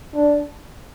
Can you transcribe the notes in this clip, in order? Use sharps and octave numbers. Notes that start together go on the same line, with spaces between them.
D4